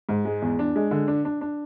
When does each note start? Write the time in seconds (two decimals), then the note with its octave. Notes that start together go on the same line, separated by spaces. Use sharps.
0.09 G#2
0.25 G#3
0.42 E2
0.59 D4
0.76 G#3
0.91 D3
1.08 D4
1.25 D4
1.41 D4